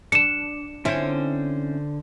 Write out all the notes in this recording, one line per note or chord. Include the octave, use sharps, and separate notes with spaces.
D4 C#7 E7
D3 C4 C#4 E4 C5